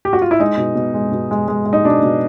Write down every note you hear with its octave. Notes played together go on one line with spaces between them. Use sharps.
G4
F#4
F4
E4
G#3 D#4
B2
B2
G#3
B2
G#3
G#3
G#3
D#4
B2 D4
B2